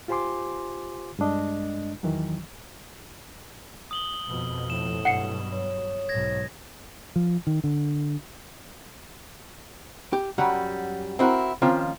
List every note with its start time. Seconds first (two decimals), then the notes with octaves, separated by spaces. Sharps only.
0.08 F4 G4 C5 G#5 C6 D6
1.19 G2 G#3 D4 D#5
2.03 E2 D#3 E3 F#3
3.91 D#6 F#7 G7
4.28 F2 B2 F3
4.70 A2 E7
5.05 G2 B2 F#3 F#5 C7 C#7
5.53 C#5
6.09 B1 G#2 G#6 A#6
7.16 F3
7.47 D#3
7.64 D3
10.13 G4
10.38 F#2 F#3 G3 F#5 A#5 B5
11.19 C4 E4 F#4 A#4
11.62 D#3 F3 A#3 C4 C#4 F4